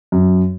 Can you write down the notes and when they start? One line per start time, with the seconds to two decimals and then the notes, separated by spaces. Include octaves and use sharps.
0.12 F#2